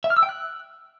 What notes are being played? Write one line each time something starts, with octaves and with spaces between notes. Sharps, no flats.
E5
F6
E6
G5
F#6